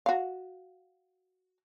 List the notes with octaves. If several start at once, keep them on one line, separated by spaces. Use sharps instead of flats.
F#4 F5